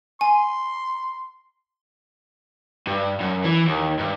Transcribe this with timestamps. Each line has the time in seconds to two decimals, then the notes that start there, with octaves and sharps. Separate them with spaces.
0.21 G#5 C6
2.87 G2
3.20 F#2
3.44 E3
3.68 D#2
3.99 G2